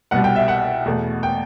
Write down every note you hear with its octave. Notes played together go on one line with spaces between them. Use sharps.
C2 B2 G3 F#5
G5
E5
F#5
E2 B2 A3
G5